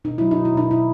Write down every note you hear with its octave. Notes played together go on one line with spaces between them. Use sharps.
B2 D#4
F#3 E4
D#4
B2
E4
B2 D#4
B2 E4